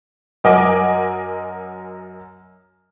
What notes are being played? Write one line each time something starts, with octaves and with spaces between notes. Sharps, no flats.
F#2 A#4 D#5 F#5 G#5 D6